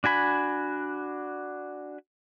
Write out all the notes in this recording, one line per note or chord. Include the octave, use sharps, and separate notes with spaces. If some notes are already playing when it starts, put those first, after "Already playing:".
D4 F#4 G#5 B5